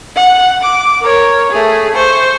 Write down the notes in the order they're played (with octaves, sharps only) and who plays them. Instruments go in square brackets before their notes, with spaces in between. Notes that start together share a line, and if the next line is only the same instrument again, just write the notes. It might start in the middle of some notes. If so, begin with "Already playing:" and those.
[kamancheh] F#5
D6
A#4 C#5
A3 G#4
C5 C#6